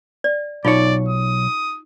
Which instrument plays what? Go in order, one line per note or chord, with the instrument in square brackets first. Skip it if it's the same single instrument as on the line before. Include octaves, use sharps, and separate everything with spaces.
[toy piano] D5
[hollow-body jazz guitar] B1 C#5 [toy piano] D#4 F4 [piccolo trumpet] D5
[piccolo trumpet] D#6